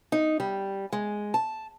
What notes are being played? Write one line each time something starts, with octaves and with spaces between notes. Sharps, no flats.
D#4
G3
G#3
A5